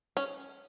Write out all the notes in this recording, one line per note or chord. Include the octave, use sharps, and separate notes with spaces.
C#4